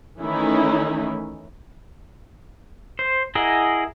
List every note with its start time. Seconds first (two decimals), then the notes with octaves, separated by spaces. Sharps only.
0.20 D#3 E3 A3 C#4 D#4 E4
2.99 C5
3.35 E4 G#4 A#4 D#5 F#5